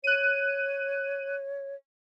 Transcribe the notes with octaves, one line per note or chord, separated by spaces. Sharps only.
C#5 F#6 D#7